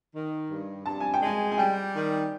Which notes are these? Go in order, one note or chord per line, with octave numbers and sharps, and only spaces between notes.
D#3
G2
G2 A5
G#5
G5
G#3 G#5
G#5
G3 G5
D#3